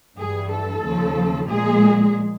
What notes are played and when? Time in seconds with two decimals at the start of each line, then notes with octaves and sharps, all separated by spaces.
0.18 G2 E3 G3 G#4
0.51 A4
0.84 D#2 C#3 F3
1.49 A#2 F3 G#3 G#4